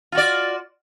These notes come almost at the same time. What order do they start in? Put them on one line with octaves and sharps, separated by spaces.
F4 F#4 D5